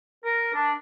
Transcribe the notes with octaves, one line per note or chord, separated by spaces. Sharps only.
A#4
D4